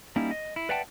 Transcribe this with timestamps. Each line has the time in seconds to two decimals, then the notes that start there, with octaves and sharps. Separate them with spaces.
0.16 G3 A#3 C#4 D#4 E4
0.31 D#5
0.56 E4
0.69 B4 D5 E5 F#5 G5 A5